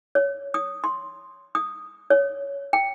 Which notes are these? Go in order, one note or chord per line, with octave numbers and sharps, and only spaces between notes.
C#5
D#6
C6
D#6
C#5
G5